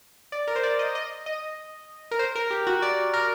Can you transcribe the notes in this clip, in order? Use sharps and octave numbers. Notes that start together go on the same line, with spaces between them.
D5
A#4
C5
D5
D#5
D#5
D#5
A#4
C5
A#4
G4
F#4
D5
A#4